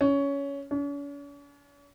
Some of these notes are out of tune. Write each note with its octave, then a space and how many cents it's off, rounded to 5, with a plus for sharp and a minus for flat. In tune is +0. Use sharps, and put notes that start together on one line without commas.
C#4 +15
C#4 +45